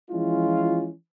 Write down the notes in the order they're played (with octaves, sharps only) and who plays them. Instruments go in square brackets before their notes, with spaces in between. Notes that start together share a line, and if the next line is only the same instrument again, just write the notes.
[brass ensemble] E3 F3 G#3 C#4 E4 F4